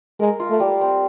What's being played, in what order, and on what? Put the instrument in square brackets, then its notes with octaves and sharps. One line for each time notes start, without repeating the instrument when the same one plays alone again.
[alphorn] G#3 [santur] A#4
[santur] F4
[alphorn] A3
[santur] G3
C4